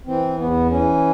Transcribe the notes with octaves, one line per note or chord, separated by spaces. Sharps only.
E3 C4
E2 B3
E3 C#4